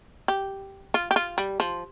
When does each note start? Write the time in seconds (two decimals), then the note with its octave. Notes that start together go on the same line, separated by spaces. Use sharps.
0.28 G4
0.94 F4
1.11 G4
1.16 F4
1.38 G3
1.60 F3